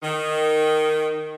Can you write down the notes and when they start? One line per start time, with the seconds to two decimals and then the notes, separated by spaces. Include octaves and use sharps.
0.03 D#3